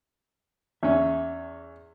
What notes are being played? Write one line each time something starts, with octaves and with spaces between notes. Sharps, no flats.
E2 C#4 E5